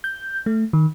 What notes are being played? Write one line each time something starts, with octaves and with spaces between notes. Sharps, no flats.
G6
A3
D#3